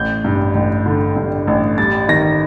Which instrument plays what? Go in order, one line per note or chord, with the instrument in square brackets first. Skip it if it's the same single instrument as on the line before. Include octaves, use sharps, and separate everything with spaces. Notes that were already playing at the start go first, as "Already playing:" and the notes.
Already playing: [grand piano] A1 G6
G2
A1
D3
G2
A1
G3 A6
D#3 A#6